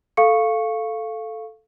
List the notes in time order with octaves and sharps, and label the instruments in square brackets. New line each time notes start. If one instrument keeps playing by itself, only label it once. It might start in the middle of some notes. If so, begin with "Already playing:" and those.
[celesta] A4 F5 C#6 C#7